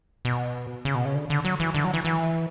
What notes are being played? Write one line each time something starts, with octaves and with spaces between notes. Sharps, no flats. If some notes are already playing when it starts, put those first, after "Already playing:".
B2
C#3
B2
C#3
D3
D3
F#3
E3
D3
F#3
E3
E3